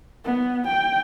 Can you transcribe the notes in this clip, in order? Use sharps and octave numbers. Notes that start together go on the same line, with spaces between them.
B3
G5